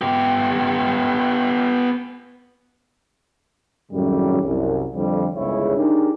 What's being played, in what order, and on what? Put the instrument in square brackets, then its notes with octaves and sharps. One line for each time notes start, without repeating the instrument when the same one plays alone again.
[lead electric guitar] B3 G4
[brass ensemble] G#1 F#2 A2 C#3 F#3 G3
C2 F#2
F2 D3 F3 G3
G1 C#2 C#3 G#3 E4 C#5
D4 D#4 G4 G#4 A#4